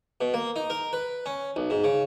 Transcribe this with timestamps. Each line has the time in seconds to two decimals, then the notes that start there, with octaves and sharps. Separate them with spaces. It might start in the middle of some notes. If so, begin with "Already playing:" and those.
0.21 B2
0.34 A#3
0.56 D#4
0.70 A#4
0.93 B4
1.26 C#4
1.56 B1
1.70 G#2
1.84 C#3